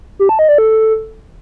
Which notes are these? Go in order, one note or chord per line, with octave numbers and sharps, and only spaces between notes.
G4
A5
D#5
D5
A4